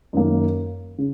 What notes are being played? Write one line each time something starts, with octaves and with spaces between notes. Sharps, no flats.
F#2 D#3 A#3
C#3